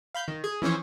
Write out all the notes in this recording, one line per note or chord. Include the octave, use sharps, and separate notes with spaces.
F5 B5 G6
D#3
G#4
E3 F3 C#4 E4 C5 C#5